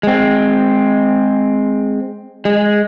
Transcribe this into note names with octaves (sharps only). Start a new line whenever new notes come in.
G#3 C4
G#3